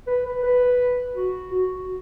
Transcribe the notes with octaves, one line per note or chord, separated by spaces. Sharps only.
B4
B4
B4
F#4
F#4